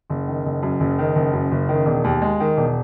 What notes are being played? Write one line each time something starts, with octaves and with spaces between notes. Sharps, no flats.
F#1
D#3
F#1
F#2
F#1
D#3
F#1
F#2
F#1
D#3
E1
D#2
G#3
D#3
E1